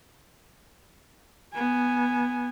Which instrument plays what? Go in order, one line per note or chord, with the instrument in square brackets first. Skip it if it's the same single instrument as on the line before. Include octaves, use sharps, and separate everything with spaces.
[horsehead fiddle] B3 G#5